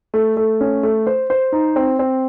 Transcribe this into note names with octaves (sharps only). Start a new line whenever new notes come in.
A3
A3
C#4
A3
C5
C5
D#4
C4
C4